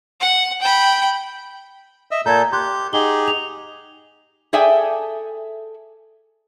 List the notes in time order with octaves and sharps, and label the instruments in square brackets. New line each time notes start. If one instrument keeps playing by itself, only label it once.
[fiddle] F#5
G5 B5
[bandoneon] D#5 E5 E6
[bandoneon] A#2 A4 G6 [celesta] A#5 G#6
[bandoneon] G4 G6 [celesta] C6 F#6
[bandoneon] D#4 G4 G#4 [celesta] F#5 G7
[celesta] F7
[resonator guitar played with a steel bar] G#4 A4 D5 E5 G5 G#5